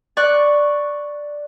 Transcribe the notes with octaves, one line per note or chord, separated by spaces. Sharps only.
D5 C#6 F#6